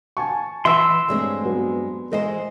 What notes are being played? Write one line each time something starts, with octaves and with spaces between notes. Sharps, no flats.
G#5 A5 C#6
E3 E5 F#5 C6 E6
G2 G#3 A3 C4 C#5
F#3 B3
E3 G#3 A#4 C5 D#5